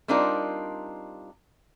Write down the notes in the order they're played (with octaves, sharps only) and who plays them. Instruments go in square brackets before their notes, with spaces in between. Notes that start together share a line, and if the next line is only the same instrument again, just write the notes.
[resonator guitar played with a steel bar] G3 C4 D4 D#4 F4 A#4